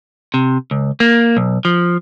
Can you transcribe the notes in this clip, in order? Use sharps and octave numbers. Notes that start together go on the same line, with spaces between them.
C3
C#2
A#3
B1
F3